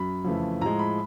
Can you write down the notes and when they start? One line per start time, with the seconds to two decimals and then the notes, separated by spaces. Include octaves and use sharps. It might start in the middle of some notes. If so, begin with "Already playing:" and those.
Already playing: F#2 B5
0.25 F2 C#3 E3 A3
0.61 A2 F3 G#3 A#5
0.79 B5